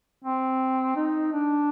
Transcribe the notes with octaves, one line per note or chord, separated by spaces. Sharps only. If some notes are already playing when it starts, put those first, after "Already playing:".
C4
D#4
D4